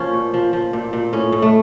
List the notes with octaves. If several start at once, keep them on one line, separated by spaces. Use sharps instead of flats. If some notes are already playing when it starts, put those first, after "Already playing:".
Already playing: F3 A#3 C#4
A#2
F3
F3
A#2
A#2
A2 C#4
A2
A3